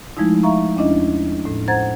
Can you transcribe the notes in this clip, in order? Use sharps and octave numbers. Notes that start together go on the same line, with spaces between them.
F3 G#3 A3 D#4 E4
E5 F5 A#5 C#6
E2 C#4 D4 E4 D#5
A2
C5 F#5 A#5 G#6 A6